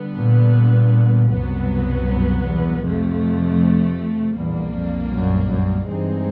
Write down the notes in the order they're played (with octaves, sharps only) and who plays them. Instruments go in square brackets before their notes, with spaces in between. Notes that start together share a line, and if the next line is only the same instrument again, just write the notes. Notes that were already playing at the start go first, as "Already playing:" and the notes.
Already playing: [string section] D3 G3 B3
[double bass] A#2
[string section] C2 B2 F#3 B3 [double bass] F#2
[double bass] F#2
E2
[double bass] F2 [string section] C3 F3 A3
[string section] B1 A#2 G3 A#3 D4 [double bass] E2
[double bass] F2
F#2
F#2
[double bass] G2 [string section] E3 G#3 C4 D#4 G#4